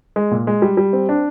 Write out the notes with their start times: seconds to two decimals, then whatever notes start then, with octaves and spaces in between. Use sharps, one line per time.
0.16 G#3
0.31 A#2
0.47 G#3
0.62 G3
0.77 G3
0.93 C4
1.09 D4